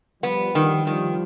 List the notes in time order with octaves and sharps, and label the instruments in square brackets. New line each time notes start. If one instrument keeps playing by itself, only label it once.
[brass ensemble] F3 G3 [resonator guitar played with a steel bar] B3
[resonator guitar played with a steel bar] D#3 [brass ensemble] F3 G3
[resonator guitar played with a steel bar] D#3 [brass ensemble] F3 G3